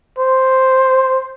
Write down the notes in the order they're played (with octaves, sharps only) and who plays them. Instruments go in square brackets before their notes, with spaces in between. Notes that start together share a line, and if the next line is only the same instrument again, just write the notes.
[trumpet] C5